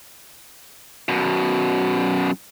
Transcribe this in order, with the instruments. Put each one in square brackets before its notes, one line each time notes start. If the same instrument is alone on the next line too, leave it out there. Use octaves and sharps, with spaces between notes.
[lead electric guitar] F#2 B2